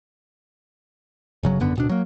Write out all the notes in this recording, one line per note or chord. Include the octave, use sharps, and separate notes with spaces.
G1 C#3 F#3
G#1 F#2 D3 B3
D1 B2 D4
F#3 A#3